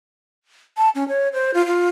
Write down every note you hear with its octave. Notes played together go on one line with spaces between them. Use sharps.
A5
C#4
C#5
C5
F4
F4